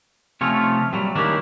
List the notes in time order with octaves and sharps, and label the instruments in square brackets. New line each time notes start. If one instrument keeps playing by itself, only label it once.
[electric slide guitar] C3 F3 A3 [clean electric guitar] C#4 F4 C#5
[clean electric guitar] A#2 F#3 [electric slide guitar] G3
[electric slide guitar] D#3 C#4 G4 [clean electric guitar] A#3 D4 E4